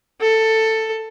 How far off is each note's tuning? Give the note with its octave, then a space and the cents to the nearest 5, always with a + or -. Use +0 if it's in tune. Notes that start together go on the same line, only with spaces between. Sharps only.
A4 +10